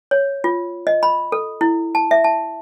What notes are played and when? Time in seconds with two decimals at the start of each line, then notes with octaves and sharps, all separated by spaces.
0.11 C#5
0.44 F4
0.87 D#5
1.03 B5
1.32 A4
1.61 E4
1.95 A5
2.11 E5
2.24 A5